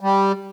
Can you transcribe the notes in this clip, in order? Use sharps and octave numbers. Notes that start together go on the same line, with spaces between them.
G3